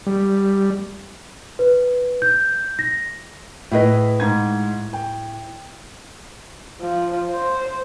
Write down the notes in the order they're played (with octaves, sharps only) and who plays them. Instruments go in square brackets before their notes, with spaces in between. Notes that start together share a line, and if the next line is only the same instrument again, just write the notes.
[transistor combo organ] G3
[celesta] B4
G6
A#6
[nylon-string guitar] A2 G#4 D#5 [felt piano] E4 B4
[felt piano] G#2 G#6
G5
[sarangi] F3
C5